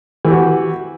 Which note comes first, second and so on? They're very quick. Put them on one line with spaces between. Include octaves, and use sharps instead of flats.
E3 G4 F#4